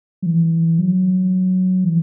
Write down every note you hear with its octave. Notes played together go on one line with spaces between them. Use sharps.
F#3
E3
F#3
E3